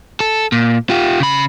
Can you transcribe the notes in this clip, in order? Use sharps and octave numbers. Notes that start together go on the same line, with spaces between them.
A4
A#2
F4 G4
C#3 B5